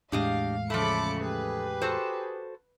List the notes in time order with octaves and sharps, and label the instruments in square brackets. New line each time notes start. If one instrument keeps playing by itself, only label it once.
[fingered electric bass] E2 A2 G#3 [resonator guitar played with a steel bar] D4 G4 D#5 [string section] F5
[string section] C#3 D6 C#7 [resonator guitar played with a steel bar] F3 A3 [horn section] A4 B5
[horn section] G4 G#4 [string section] B4
[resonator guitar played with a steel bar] F#4 A4 C5